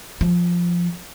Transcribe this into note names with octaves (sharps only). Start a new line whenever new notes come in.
F3